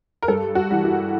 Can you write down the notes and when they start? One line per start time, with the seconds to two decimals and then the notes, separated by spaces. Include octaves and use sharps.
0.23 A#4
0.28 G2 A4
0.55 F#4
0.70 E3 G3
0.84 E4